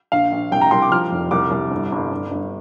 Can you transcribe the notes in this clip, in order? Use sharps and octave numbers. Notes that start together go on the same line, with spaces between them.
A#1 F5
A#1
C2 G5
A#5
C2 C6
D6
F3 F6
F1
C2 D6
C2
G1
G1
G1
G1